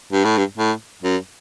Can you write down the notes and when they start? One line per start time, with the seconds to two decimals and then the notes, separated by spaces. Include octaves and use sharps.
0.13 G2
0.25 A2
0.38 G2
0.58 A2
1.03 F#2